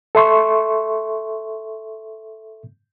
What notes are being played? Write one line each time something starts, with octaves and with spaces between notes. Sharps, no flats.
A4 E5 C6 C#6